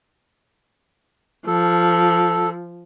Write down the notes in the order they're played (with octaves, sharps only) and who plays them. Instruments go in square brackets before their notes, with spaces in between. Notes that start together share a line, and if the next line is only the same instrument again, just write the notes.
[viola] F3 [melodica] A4